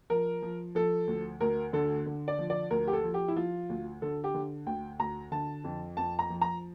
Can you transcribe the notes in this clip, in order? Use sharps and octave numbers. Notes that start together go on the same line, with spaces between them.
F3 A#4
F3
F3 A4
D2
D2 A#4
D3 A4
D3
D5
F3
D5
D2 A#4
G4
A4
F3
G4
E4
F3 F4
D2
D3 A4
G4
D3
D2 G5
D2 A#5
D3 A5
F2
F2 A5
A#5
F3
A#5